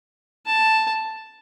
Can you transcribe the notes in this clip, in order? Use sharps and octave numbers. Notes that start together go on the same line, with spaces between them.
A5